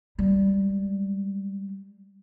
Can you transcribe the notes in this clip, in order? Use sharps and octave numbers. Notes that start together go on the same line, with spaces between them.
G3 G#3